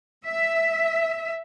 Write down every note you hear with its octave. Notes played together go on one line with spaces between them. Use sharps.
E5